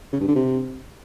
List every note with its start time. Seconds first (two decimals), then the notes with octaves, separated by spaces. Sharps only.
0.13 C#3
0.21 G2
0.28 D3
0.36 C3